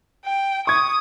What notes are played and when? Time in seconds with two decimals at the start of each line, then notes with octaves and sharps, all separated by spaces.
0.25 G5
0.67 C#6 D#6 G#6